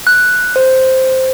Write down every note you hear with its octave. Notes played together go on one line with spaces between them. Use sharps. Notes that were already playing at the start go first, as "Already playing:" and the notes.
F#6
C5